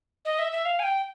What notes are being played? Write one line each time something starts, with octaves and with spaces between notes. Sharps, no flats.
D#5
E5
E5
F5
G#5
G5